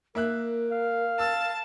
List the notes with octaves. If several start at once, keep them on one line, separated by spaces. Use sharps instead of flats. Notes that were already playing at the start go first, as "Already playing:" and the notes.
A#3 A#4 E5 F#6
F5
A5 E6